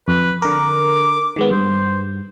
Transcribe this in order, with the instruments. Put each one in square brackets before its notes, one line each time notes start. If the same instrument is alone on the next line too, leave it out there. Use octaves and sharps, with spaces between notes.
[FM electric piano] F2 [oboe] B4
[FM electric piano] D3 A#4 [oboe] D6
[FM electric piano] D#3 G#3 B3
[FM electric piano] G2 [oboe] C5